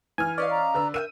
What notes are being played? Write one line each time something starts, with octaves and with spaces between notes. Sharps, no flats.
E3 G#5 F6
C#4 B4 D5 D#5 F5
A#5
D3 B4 E6
A#4 E5 F#5 G5 D#7